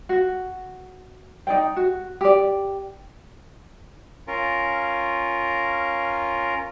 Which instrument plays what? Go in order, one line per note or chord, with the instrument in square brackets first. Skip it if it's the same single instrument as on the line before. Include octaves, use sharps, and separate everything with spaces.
[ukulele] F#4
D#4 D5 G5
F#4
G4 D5
[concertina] C#4 F4 A#4